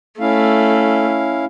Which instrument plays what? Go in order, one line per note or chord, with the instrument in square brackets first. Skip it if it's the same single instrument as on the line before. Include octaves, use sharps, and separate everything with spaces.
[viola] A3 [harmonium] C#4 E4 F5